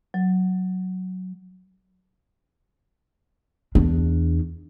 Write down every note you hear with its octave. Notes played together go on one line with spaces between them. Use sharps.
F#3
E2 D4